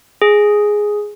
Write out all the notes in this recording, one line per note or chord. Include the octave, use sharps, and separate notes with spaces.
G#4